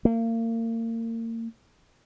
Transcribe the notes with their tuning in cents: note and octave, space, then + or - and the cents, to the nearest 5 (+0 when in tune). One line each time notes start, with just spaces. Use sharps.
A#3 -35